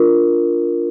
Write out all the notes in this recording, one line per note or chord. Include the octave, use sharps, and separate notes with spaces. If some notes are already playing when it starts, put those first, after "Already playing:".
Already playing: D4 F4 A#4